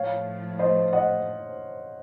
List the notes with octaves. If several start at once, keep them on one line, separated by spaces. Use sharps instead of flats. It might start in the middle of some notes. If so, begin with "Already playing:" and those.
Already playing: A2 F3 A3 C#5 F5
C5 D#5
D#5 F#5